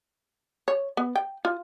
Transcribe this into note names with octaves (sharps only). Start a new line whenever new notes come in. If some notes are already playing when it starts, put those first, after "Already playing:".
C#5
B3
G5
F4